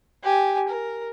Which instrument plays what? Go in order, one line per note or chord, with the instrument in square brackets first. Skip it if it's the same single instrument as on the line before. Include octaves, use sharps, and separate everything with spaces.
[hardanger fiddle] G4 G#5
A#4